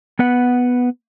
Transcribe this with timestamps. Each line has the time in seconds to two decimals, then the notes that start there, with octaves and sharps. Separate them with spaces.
0.19 B3 B4 F#5